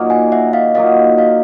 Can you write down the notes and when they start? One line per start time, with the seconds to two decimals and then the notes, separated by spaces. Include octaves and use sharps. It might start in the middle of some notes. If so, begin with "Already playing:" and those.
Already playing: A#2 F#3 A#3 D#4
0.10 F#5 G#5
0.32 E5 F#5
0.53 D#5 F5
0.75 A#2 F#3 A#3 D#4 D#5 F5
1.18 D#5 F5